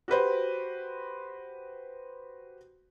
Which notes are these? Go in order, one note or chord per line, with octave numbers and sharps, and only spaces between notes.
F#4 G4 B4 C5